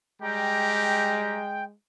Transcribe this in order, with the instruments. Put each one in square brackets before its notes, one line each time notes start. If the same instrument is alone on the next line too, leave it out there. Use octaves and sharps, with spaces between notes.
[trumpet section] G3 G4 A#5 [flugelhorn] G#3 [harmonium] G5